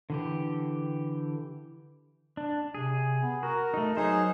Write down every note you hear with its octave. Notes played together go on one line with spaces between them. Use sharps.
D3 E3 G4
D4
C3 G#4
B3
F#4 A#4
A3 D#4
F#3 D#4 G#4 C5